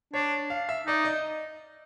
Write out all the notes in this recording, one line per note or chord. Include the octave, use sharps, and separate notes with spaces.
D4 C#5
F5
E5
D#4 D5
D#5